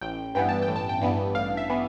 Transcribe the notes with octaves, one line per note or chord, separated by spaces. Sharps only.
A1 G5
G2 E3 B3 G5
A5
G5
A1
A5
G5
G2 E3 B3
A1 F5
E5
E3 B3